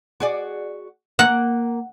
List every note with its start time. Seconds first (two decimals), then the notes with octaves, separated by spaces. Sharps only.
0.20 F#4 G#4 D5
1.19 A#3 F#5